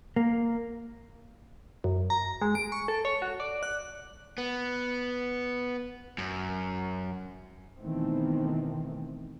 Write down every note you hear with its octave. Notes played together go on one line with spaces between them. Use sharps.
A#3
F#2
A#5
G#3
D7
C#6
A4
C#5
F#4
D5
F#6
B3
F#2
B2 D#3 E3 A3 B3 C4